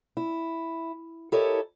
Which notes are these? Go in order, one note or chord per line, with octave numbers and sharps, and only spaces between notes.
E4
E4 G4 A4 A#4 C#5 D#5